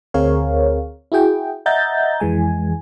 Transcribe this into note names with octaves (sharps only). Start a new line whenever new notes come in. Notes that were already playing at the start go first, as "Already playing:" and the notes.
D2 C4 G#4 A#4 C#5 F5
E4 F#4 G#4 G5
D#5 E5 F#5 A#5 G6 A6
F2 E3 G#3 G#5